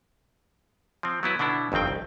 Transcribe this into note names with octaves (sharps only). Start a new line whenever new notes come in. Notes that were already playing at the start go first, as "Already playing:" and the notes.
F3 C4
F#3 B3 E4 B4
B2 D3 B3 D4 E4
G1 F2 D#3 C4 G5
C2